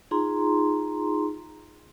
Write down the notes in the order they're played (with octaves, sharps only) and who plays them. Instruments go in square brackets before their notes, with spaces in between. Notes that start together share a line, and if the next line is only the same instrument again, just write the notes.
[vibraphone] D#4 F4 G#4 A#5 C6